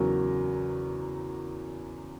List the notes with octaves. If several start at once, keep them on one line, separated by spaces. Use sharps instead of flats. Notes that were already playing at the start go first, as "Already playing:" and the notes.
Already playing: E2 C#3 F#3 A#4